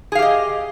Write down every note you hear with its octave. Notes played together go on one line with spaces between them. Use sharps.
G4 G#4 D#5 F5